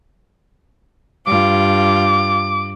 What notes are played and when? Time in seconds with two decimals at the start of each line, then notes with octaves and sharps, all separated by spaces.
1.27 G2 F4 D6